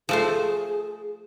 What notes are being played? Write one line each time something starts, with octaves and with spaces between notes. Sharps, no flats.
F3 A3 G#4 C5